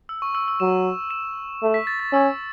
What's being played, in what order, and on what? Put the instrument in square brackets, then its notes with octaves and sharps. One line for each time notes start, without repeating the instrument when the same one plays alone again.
[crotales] E6
C#6
E6
E6
[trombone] F#3 [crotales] E7
[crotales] E7
[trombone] A3
[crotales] B6
A6
A6
[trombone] C#4 [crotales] E6